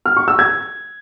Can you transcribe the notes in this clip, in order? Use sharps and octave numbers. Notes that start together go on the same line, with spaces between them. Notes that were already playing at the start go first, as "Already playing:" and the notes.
F6
C#6
E6
G#6